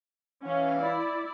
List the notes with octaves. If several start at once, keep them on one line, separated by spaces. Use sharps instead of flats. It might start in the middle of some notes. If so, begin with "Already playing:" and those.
E3 C#4 F5
E4 D5